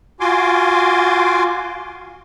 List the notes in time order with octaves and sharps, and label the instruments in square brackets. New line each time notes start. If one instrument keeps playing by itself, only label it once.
[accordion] F4 F#4 G#5 C6 D6